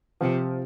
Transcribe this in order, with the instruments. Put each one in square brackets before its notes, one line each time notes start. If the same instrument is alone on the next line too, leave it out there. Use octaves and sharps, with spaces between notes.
[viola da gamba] C3 [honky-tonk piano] F3